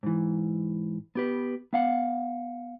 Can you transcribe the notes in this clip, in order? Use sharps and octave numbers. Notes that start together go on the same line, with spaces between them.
G#2 E3
B3 G4 B4
B3 F5 F#5